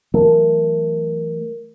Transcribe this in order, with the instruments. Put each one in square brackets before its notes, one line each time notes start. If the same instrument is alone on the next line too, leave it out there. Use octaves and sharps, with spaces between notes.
[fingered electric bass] E3 F#3 A3 [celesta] A#4